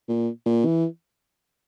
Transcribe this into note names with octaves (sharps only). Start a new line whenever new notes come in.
A#2
A#2
E3